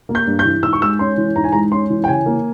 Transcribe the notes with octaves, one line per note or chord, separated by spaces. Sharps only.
A#3
G6
G2
G6
E3
G#2 E6
C#6
G#3 E6
C#4 C6
E3
G#2 A#5
G#5
G#3 A#5
C#4 C6
E3
G5
C#3 G#5
A#3